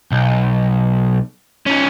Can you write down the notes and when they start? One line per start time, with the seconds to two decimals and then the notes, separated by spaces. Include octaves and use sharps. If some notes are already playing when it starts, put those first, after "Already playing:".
0.12 B1
1.66 C#4 D#4